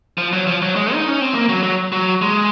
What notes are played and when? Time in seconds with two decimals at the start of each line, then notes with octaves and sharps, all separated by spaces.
0.18 F3
0.33 F#3
0.47 F3
0.62 F#3
0.76 G#3
0.94 D#4
1.08 C#4
1.21 C4
1.34 A#3
1.49 F#3
1.63 F#3
1.92 F#3
2.22 G#3